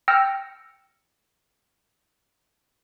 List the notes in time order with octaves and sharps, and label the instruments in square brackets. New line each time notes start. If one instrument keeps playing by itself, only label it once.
[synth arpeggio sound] G5 E6 F6 A#6 C#7